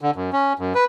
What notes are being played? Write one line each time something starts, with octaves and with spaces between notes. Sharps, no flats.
D3
F#2
C#4
F#2
B4